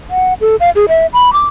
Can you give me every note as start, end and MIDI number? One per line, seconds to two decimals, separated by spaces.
0.10 0.34 78
0.41 0.56 69
0.60 0.70 77
0.76 0.86 68
0.89 1.06 76
1.13 1.33 83
1.33 1.47 86